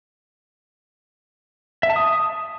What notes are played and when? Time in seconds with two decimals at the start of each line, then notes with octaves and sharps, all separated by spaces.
1.83 E5
1.90 A5
1.96 D#6